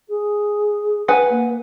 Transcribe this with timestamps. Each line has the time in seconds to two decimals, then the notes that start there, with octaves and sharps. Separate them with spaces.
0.09 G#4
1.08 B4 F#5 G#5
1.29 A#3